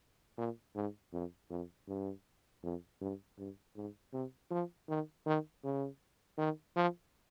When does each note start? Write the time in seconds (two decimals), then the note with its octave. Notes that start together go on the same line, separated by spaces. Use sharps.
0.38 A#2
0.76 G#2
1.13 F2
1.51 F2
1.88 G2
2.63 F2
3.01 G2
3.38 G2
3.76 G#2
4.13 C3
4.51 F3
4.89 D#3
5.26 D#3
5.64 C#3
6.38 D#3
6.76 F3